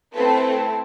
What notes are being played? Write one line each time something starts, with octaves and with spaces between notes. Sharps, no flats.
A3 C4 E4 A4 B4